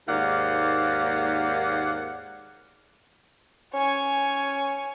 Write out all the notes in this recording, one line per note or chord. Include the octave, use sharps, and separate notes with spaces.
D#2 G#2 A#3 D5 F5 F#5
C#4 C#5 G#5